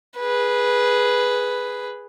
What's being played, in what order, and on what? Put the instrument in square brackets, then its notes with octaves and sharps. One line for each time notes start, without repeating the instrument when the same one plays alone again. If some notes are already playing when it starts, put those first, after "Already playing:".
[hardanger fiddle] G#4 B4